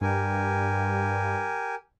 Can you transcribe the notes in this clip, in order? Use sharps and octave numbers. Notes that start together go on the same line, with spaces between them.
G2 G4 A#4 G#5